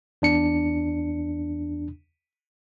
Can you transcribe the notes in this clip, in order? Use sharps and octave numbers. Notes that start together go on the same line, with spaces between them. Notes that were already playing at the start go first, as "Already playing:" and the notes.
E2 D4 C#7